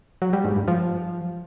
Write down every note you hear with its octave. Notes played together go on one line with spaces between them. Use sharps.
F#3
G3
G#2
G2
F3